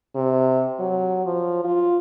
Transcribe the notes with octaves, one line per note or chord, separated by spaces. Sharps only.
C3
F#3
F3
F4